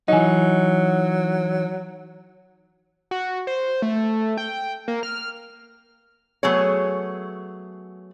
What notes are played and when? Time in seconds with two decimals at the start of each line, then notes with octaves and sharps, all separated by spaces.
0.08 E3 F#3 D#4 D#5 G#5
3.11 F#4
3.47 C5
3.82 A3
4.37 G5
4.88 A#3
5.03 F6
6.43 F#3 A3 B3 G#4 C#5